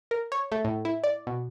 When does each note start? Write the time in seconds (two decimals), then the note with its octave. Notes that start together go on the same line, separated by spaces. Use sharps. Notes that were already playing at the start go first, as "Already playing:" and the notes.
0.11 A#4
0.32 C#5
0.52 A3
0.65 A2
0.85 E4
1.04 D5
1.27 B2